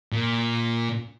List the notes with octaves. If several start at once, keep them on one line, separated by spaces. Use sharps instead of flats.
A#2